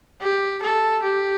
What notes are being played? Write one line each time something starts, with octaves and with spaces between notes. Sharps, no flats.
G4
A4
G4